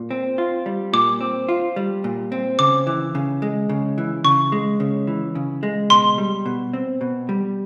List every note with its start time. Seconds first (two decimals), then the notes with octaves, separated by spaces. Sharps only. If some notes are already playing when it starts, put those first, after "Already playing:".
Already playing: A#2
0.11 C4
0.38 F4
0.66 G3
0.93 A#2 D6
1.21 C4
1.49 F4
1.76 G3
2.04 A#2
2.32 C4
2.59 C#3 D6
2.87 E3
3.15 C#3
3.42 G#3
3.69 C#3
3.98 E3
4.25 C#3 C#6
4.52 G#3
4.80 C#3
5.07 E3
5.35 C#3
5.63 G#3
5.90 B2 C6
6.18 G3
6.46 B2
6.74 C4
7.01 B2
7.29 G3